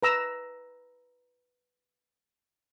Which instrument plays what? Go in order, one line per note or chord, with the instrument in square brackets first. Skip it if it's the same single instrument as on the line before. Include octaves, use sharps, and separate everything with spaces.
[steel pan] B4 A#5 E6